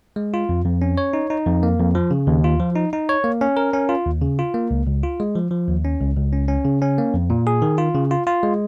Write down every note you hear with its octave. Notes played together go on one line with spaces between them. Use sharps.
G#3
F4
F2
F2
C#4
C#5
D#4
D#4
F2
A#3
F2
F3
C#3
D#2
F4
F3
D#4
D#4
C#5
A#3
C#4
A#4
C#4
F4
D#2
C#3
F4
A#3
C#2
C#2
F4
G#3
F3
F3
D#2
C#4
C#2
C#2
C#4
C#4
C#3
C#4
A#3
F2
A#2
G#4
D#3
F4
C#3
F4
F4
G#3